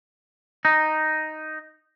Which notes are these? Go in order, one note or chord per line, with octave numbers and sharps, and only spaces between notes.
D#4